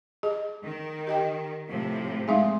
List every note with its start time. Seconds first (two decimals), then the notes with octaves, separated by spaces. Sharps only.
0.23 G#4 D#5
0.63 D#3
1.07 G4 D#5 G5
1.68 A2 C3 F3
2.28 G#3 C4 D#4 G#4 E5 F5